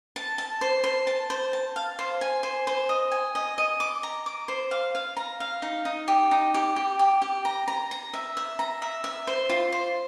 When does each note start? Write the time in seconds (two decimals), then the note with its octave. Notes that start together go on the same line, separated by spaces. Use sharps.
0.16 A5
0.38 A5
0.61 C5
0.84 C5
1.07 A5
1.30 C5
1.53 A5
1.76 F5
1.99 C5
2.21 G#5
2.43 C5
2.67 C5
2.89 D#5
3.12 G#5
3.35 D#5
3.58 D#5
3.80 D6
4.03 A#5
4.26 D6
4.48 C5
4.71 F5
4.95 F5
5.17 A#5
5.40 F5
5.62 D#4
5.85 D#4
6.08 G4
6.31 D#4
6.54 G4
6.76 G4
6.99 G4
7.22 G4
7.45 A#5
7.68 A#5
7.91 A#5
8.13 E5
8.37 E5
8.59 A#5
8.82 E5
9.04 E5
9.27 C5
9.49 F4
9.72 C5